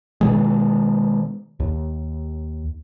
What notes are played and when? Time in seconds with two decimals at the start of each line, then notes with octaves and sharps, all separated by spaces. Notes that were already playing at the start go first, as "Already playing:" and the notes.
0.21 B2 D#3 G#3
1.60 D#2